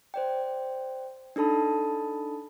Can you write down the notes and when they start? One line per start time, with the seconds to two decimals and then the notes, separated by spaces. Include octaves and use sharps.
0.14 C5 D5 G5
1.36 D4 D#4 A4 A5 B5